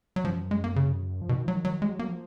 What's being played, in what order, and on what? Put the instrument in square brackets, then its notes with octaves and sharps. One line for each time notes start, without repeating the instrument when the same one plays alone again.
[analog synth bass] F#3
[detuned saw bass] F#2 [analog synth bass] F3
[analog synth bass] G#3
A#3
C#3
[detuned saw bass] F3
[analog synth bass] B2 [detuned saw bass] D#3
[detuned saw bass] F3 [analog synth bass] F#3
[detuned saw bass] D#3
[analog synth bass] F#3
[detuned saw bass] F#3 [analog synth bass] G#3
[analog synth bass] A#3
[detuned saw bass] F#3
F3